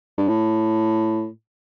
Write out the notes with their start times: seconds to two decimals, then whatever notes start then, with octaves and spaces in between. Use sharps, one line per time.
0.18 G2
0.28 A2